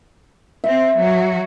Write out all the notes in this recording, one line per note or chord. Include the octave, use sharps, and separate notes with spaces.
C4 E5
F#3 F#4